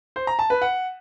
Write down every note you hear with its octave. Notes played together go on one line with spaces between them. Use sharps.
C5
A#5
A5
B4
F#5